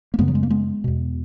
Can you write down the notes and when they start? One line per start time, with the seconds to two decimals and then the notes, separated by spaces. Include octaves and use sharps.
0.14 A#3
0.19 F#2 C#3 G#3 B3
0.28 F#3
0.35 G#3
0.43 A#3
0.50 G#3 B3
0.84 E2 B2